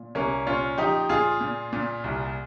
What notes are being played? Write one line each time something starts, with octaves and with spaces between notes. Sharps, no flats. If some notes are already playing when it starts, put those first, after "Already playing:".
Already playing: A#2
C2 A#3 C#4
A#2 C#4 F4
F3 D#4 G4
A#2 F4 G#4
A#2
A#2
C2